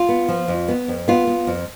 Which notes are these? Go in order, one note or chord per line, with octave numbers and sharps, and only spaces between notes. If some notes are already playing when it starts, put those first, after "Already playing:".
Already playing: F4
B3
F3
F2
B3
F2
B3 F4
B3
F2